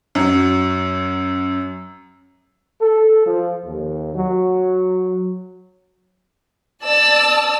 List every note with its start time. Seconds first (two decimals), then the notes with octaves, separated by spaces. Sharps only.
0.15 F#2 F#3
2.80 A4
3.26 F3
3.65 D#2
4.15 F#3
6.86 D5 A5 E6